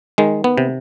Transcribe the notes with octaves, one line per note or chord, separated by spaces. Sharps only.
D#3 G#3
B3
C3